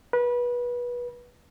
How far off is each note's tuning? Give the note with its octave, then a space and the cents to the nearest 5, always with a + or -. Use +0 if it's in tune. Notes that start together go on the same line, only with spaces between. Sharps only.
B4 -25